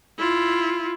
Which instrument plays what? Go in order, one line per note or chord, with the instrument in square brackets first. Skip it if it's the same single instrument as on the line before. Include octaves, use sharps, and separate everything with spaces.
[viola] E4 F4